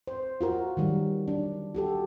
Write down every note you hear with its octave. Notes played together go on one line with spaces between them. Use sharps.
C5
F4 F#4 A#4
D#3 F#3 G3
D4
F#4 G4 A4